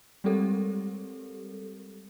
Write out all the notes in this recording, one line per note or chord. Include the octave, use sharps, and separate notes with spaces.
G3 G#3 C4 G4 A4 A#4